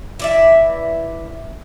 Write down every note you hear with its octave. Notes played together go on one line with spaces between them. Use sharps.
E3 D5 E5